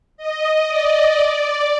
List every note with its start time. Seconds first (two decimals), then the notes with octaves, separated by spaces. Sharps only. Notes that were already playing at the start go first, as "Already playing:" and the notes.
0.17 D#5
0.67 D5
1.16 D5